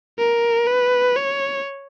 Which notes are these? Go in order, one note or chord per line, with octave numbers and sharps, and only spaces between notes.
A#4
B4
C#5